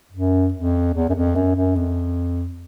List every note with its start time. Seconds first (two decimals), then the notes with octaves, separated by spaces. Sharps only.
0.12 F#2
0.54 F2
0.94 E2
1.09 F#2
1.14 F2
1.35 F#2
1.55 F#2
1.75 F2